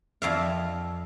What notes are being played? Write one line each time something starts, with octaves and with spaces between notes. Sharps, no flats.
F2 E5 F5